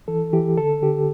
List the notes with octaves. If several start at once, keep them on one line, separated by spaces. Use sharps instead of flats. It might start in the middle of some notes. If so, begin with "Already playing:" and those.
E3 A4
E3 G4
D3 A4
D3 G4